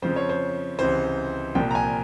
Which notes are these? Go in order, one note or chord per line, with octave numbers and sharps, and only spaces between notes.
F2 C#3 F3 C5
C#5
C5
C#2 C3 E3 C5
C2 A#2 F3 G5
A#5
G#5